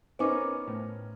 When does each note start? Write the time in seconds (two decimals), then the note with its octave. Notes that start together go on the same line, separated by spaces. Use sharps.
0.19 B3 C#4 D#4 A#4 C5 G#5 C#6 D6
0.68 A2 C5